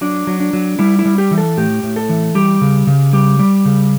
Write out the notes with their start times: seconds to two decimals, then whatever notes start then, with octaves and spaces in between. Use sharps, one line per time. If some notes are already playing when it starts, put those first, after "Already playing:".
0.01 F#3 D4
0.27 F#3
0.40 D4
0.53 F#3
0.79 G3 E4
0.99 E4
1.06 G3
1.18 G4
1.31 E3
1.38 A4
1.57 A2 G4
1.83 A2
1.96 A4
2.09 E3
2.35 G3 G4
2.61 C#3
2.87 C#3
3.13 G3 G4
3.39 G3
3.65 C#3